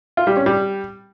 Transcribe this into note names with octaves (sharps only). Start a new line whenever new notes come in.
F4
G3
C#4
G3